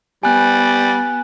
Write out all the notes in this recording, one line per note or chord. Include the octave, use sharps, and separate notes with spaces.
G3 B3 G#5 F#6